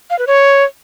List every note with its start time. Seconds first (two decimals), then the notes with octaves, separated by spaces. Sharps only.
0.10 F5
0.19 B4
0.27 C#5